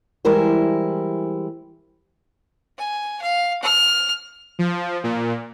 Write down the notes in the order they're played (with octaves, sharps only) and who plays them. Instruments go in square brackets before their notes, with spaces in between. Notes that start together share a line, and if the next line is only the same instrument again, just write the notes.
[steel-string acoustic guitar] E3 G3 G#3 E4 A#4 C5
[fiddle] G#5
F5
F6
[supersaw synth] F3
A#2